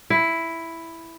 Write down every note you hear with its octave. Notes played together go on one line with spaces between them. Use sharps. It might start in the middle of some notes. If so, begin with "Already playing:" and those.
E4